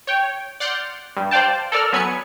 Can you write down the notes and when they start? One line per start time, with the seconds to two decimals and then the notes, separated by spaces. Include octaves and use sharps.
0.07 C#5 G5
0.60 D5 F#5 C6 F6 G6
1.17 G2
1.31 C5 D5 F5 G5 A5
1.72 A4 A#4 D5 E6 F6
1.93 F#3 B3 G#5 B5 C#7